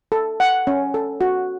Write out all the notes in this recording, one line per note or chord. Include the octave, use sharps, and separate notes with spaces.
A4
F#5
C#4
A4
F#4